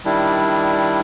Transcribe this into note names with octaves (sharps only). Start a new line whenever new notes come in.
D#3 G3 D4 E4